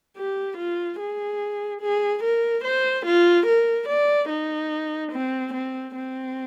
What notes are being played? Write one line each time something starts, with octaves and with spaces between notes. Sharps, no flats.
G4
F4
G#4
G#4
A#4
C5
F4
A#4
D5
D#4
C4
C4
C4